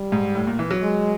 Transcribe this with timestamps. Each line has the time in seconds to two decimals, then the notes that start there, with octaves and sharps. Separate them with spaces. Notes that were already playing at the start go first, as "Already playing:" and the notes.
Already playing: G3
0.12 G#2
0.35 A2
0.47 A#2
0.59 E3
0.71 F#3
0.82 G#3